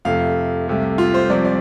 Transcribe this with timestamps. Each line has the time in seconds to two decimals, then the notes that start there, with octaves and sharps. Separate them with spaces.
0.05 F2 C3 A3 F5
0.67 C2 C3 A3
0.98 F4
1.14 C5
1.30 C2 C3 F3 C4 D5
1.45 D5